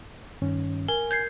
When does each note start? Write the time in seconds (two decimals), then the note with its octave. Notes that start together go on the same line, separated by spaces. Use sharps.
0.42 G2 D#3 C#4
0.88 A#4 G#5
1.11 G6 G#6 C7